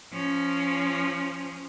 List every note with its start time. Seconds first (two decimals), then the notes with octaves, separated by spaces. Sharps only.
0.13 F3 C#4